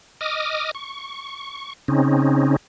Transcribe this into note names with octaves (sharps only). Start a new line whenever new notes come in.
D#5 D6 D#6 F6
C#6
C#3 C4 C#4 D#4